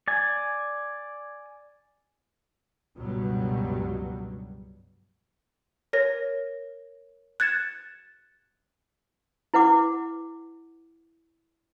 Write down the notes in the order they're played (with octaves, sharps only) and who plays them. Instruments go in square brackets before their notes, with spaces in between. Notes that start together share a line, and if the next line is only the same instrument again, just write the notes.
[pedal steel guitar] D5 G#5
[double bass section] C#2 G2 B2 F#3 G3
[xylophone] A#4 C#5 A#6
F#6 G#6 A6 C#7 E7
[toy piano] E4 B4 F#5 D6